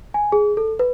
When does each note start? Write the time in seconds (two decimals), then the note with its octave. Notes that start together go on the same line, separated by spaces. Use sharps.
0.14 G#5
0.32 G#4
0.57 A4
0.79 B4